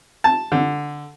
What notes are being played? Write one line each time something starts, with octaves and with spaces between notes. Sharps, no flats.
A5
D3